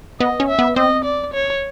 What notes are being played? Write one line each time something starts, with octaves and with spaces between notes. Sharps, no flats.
B3 D#5
C#4
E5
B3
C4 D#5
D5
C#5